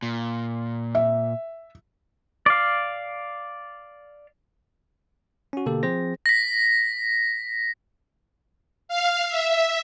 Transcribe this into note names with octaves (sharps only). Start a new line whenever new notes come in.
A#2
E5
D5 F5
C#4 F#4
B2 D3 A#3 G4 A4
F3 C4 G#4 C5 A#6
A#6 B6
F5
E5